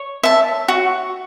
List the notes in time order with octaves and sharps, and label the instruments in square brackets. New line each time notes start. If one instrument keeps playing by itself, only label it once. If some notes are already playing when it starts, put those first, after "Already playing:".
Already playing: [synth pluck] C#5
[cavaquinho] E5 A5
F#4